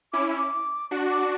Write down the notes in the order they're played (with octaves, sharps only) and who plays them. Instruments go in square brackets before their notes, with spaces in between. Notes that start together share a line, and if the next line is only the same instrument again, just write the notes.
[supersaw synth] C#4 E4 [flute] D6
[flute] D6
[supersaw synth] D4 F#4
[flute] D6